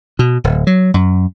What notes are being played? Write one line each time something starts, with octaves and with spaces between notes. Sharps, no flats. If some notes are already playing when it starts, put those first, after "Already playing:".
B2
D1
F#3
F#2